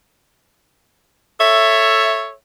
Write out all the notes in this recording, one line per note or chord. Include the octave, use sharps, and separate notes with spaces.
A4 C#5 E5